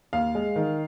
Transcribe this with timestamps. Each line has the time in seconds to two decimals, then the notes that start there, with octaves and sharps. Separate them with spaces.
0.13 D#2 F5
0.35 G#3
0.56 D#3